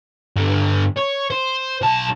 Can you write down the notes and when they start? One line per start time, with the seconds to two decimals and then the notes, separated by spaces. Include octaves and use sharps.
0.36 G2 D3
0.96 C#5
1.30 C5
1.82 B1 A5